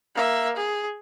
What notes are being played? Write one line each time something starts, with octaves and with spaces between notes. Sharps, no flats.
A#3 E5
G#4